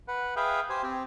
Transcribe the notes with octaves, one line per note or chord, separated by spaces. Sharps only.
B4 F#5
G#4 B4 E5 F5 G5
G4 C5 G#5
C4 G4